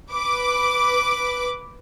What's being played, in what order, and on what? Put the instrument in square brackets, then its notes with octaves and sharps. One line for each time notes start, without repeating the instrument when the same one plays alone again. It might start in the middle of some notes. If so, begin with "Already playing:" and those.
[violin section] B4 D6